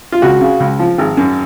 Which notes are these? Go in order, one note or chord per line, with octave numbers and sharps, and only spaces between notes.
F4
C#2 F#4
C#3
C#2
F3
G#1
F#2